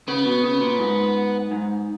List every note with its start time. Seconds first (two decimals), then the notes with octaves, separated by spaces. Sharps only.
0.08 C#3 B3
0.25 B2
0.44 C#3
0.61 A#2
0.79 G#2
1.51 G#2